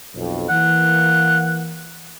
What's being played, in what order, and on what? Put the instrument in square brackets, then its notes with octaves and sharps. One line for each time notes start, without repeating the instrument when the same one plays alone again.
[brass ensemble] B1 F2
[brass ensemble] E3 A#3 [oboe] F#5